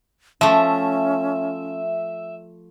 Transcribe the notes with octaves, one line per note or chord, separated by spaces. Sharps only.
F3 A3 C#4 E5